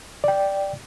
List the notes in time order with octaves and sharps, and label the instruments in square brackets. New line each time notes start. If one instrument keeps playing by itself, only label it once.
[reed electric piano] D5 G5